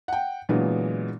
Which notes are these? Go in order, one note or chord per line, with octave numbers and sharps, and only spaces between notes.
F#5 G5
A#2 D3 E3 F#3 G#3 B3